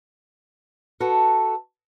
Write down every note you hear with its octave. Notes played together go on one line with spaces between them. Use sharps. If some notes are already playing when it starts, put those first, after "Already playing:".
F#4 A4 B4